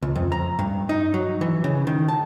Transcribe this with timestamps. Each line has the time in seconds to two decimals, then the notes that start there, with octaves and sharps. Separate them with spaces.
0.03 C#2
0.16 F2
0.32 A#5
0.59 G2
0.89 D#4
1.14 F#3
1.41 E3
1.64 C#3
1.87 D#3
2.08 A5